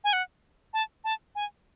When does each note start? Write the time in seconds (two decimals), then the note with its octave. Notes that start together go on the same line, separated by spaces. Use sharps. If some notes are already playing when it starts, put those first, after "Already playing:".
0.04 G#5
0.13 F#5
0.74 A5
1.04 A5
1.35 G#5